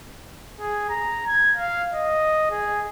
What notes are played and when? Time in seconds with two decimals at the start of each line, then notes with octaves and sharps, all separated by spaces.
0.60 G#4
0.90 A#5
1.27 G#6
1.56 F5
1.94 D#5
2.51 G#4